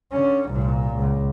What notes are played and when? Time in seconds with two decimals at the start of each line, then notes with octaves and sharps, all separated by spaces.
0.12 D3 C#4
0.50 C2 A#2
0.95 C#2